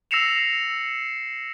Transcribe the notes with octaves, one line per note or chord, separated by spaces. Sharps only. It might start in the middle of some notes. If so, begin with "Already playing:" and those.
E6 A#6 C7 C#7 E7 F7